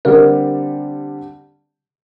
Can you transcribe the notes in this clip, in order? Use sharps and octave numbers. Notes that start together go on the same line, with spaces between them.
D3 G3 C4 G4 A#4 D5